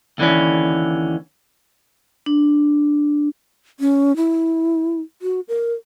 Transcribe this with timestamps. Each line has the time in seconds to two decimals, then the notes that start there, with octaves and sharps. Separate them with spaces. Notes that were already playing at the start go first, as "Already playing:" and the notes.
0.18 D#2 D3 E3 C#4
2.26 D4
3.80 C#4
4.16 E4
5.22 F#4
5.48 A#4